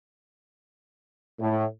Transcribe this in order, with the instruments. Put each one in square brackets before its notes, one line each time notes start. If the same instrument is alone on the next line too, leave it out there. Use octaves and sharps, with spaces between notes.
[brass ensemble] A2